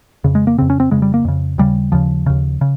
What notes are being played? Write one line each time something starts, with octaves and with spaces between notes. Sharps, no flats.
F2 C#3
G#3
A#3
F2 C#3 C4
C#4
C4
F2 C#3 G#3
G3
A#3
F2 C#3
D#2 C#3 G3
D#2 C#3 F3
D#2 C#3
C#3